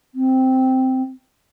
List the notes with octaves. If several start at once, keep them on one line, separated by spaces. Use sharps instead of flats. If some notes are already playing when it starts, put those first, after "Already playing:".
C4